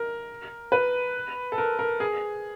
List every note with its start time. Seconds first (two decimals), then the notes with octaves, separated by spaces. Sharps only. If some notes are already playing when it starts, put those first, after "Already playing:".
Already playing: A#4
0.72 B4
1.52 A4
1.58 A#4
1.79 A#4
2.00 G#4